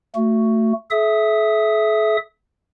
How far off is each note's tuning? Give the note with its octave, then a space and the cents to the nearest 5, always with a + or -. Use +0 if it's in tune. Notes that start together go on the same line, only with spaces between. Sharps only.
A3 +20 F#4 +0
A4 -45 E5 +0 D#6 +0